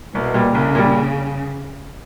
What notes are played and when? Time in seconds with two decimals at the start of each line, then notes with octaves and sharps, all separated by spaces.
0.14 C2 B2
0.34 A#2 G3
0.55 C2 C#3
0.75 A#2 G3